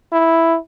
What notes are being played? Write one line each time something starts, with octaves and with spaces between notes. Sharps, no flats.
E4